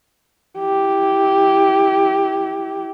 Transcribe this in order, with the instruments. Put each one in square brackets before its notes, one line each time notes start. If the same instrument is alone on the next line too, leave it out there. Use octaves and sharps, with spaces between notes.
[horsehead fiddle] E4 G4